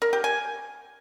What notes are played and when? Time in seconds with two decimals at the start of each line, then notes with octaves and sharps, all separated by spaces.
0.02 A#4
0.13 G4
0.24 G#5